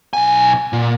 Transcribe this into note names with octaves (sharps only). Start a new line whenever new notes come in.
B1 G#5
A#2